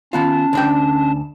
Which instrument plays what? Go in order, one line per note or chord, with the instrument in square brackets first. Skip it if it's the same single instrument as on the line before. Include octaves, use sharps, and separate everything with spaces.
[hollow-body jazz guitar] D#3 B3 F4 [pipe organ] C#4 A5
[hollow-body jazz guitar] D2 D4 G5